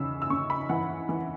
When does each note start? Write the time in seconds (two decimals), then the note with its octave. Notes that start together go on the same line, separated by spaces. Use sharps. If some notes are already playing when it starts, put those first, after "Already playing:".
Already playing: E2 C#3 B5 E6
0.22 E6
0.30 C#3 C#6
0.50 B5
0.69 E3 F#5
1.09 E3